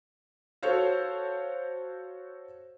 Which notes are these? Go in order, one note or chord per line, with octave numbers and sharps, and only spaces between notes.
F#4 A4 C5 C#5 F5